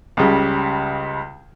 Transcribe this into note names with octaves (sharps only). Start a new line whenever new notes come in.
C#2 C#3 G3